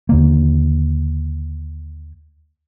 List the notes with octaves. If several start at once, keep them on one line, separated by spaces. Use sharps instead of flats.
D#2 D3 A#3